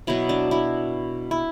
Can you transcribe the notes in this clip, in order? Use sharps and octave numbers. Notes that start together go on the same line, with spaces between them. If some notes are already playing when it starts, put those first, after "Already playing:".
B2 F#3 B3 E4
D4
E4
E4